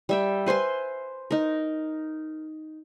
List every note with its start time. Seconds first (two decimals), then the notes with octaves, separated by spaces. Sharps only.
0.09 G3 E5 G5
0.46 B4 C5 G#5 C6
1.31 D#4 A#4